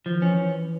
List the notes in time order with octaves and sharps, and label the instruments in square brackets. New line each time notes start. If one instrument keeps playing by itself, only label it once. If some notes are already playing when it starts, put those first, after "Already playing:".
[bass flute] E3 [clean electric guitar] F3
[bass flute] D#3
[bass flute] E3 [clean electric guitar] C#4